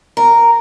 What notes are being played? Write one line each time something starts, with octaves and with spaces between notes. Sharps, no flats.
A#4